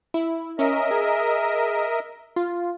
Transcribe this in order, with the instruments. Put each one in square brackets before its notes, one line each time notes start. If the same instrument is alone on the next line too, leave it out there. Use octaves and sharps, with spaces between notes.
[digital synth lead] E4
[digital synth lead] C#4 [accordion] A#4 D#5 E5
[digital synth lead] G#4
F4